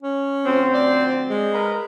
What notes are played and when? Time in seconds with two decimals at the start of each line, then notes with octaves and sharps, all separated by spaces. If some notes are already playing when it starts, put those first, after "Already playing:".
0.03 C#4
0.46 D2 F3 C4
0.73 D5
1.30 G#3
1.53 A#4 B4